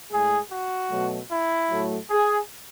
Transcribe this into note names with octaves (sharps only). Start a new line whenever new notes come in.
A2 G#3 G#4
F#4
B2 F#3 A3
E4
A2 F#3 A3
G#4